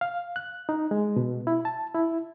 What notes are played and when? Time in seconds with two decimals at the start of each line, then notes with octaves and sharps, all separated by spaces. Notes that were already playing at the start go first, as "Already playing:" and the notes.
0.01 F5
0.36 F#6
0.69 D#4
0.91 G#3
1.16 B2
1.47 E4
1.65 A5
1.95 E4